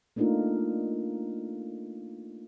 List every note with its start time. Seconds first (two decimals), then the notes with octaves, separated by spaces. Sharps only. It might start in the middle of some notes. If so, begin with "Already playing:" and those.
0.16 A3 A#3 D4 D#4 F4 A#4